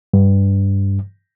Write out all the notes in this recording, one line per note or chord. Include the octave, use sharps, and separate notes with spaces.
G2